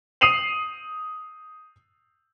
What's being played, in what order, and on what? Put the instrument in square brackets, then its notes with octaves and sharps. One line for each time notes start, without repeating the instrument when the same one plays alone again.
[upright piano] D#6 C7 D#7 F7 F#7